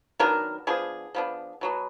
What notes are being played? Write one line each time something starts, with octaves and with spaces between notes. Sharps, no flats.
D#3 F#3 B3 D4 A#4
F3 B3 D4 G#4
F3 B3 D4
B2 F#3 B3